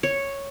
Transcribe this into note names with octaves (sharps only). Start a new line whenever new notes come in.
C#5